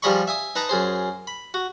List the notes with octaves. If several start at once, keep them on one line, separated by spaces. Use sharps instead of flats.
F3 G3 G#4 D#5 B5 C#6
E5 G#5 D#6
D#4 B4 A5 A#5
F#2 G#4 C5
B5
F#4